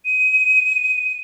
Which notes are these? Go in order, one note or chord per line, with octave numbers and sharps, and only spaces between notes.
D#7